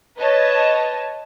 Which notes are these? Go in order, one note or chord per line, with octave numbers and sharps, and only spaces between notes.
B4 C#5 D#5 A5